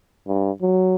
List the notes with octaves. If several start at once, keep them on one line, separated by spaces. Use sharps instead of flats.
G2
F#3